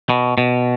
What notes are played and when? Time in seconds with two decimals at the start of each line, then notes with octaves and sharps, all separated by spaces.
0.09 B2
0.38 B2